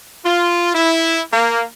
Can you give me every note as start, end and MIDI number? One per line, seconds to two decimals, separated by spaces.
0.25 0.70 65
0.74 1.20 64
1.33 1.62 58